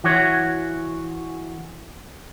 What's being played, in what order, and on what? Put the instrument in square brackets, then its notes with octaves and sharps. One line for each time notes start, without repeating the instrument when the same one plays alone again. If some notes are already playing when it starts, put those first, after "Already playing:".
[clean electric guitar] E3 F#4 C#5